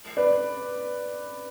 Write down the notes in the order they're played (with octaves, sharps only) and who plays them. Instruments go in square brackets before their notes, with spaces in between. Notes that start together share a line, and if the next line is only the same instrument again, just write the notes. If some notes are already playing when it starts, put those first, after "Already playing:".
[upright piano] B4 D5